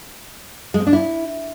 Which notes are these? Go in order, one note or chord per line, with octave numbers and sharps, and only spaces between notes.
G#3
C4
D4
E4